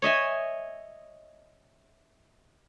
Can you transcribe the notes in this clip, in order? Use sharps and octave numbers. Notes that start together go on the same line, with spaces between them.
C#5 D#5 E5 G#5